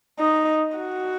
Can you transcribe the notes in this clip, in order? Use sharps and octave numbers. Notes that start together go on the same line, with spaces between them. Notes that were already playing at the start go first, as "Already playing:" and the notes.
D#4
F#4